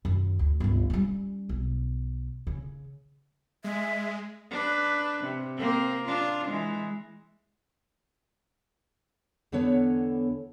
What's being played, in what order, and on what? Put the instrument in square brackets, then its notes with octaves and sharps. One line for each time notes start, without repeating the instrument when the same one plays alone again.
[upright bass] F#2 D#3
D2
G1 C#2
G3 C#4
B1
C#3
[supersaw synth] G#3 [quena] E5
[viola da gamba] D4 B4
C3
A#3 C4
D4 F4
E3 G#3
[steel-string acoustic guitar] E2 D3 B3 A4 C#5